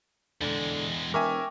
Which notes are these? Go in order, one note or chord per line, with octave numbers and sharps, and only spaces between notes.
E2 D3 G#3
E1 A#4 E5 G5 G#5 C#6 D6